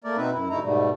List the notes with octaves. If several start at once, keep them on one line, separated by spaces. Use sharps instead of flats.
A3 A#3 A#4 D5
B2 C4 D#4 B4 E5
F#2 E4
D2 G2 A3 D#4 E4 A#5
G#2 B2 G3 A3